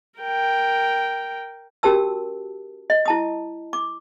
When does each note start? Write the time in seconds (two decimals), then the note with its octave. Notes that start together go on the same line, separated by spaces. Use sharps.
0.20 A#4 G5
1.83 C#4 F#4 G4 A#4 A5 E6
2.90 D#5
3.06 E4 A5 D#6
3.73 D6